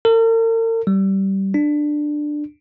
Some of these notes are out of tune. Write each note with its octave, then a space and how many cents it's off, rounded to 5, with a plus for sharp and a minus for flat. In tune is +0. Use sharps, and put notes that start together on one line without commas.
A#4 -45
G3 -20
D4 +15